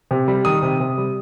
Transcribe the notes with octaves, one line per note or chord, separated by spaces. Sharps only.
C3
G3
D#3 D#6
C3
C3
G3